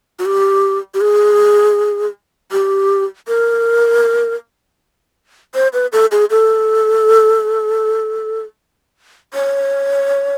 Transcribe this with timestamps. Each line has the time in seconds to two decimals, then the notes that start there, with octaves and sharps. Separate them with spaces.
0.19 F#4
0.25 G4
0.94 G4
1.01 G#4
2.52 G4
3.28 A#4
5.55 C5
5.73 B4
5.93 A4
6.12 G#4
6.30 A4
9.34 C#5